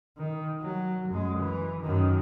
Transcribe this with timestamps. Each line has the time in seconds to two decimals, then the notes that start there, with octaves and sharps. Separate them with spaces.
0.17 D#3
0.60 F#3
1.08 F#2 G#3
1.38 E3
1.81 F#2 D#3